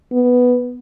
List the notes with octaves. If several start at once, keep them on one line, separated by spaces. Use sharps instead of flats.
B3